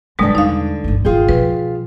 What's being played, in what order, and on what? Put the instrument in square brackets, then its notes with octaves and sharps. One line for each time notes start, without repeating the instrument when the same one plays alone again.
[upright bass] G1 F#2 [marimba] B2 G3 G#3 [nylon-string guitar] D3 D4
[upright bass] E2 C3 [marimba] D#4 F5
[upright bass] G1 C#2
[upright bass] G#1 [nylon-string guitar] F4 G#4 G5
[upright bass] B2 F3 [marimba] B4